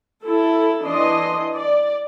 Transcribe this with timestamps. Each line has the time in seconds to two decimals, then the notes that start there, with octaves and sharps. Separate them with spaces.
0.24 E4 A4
0.82 E3 D4 D#5 C6
1.56 D5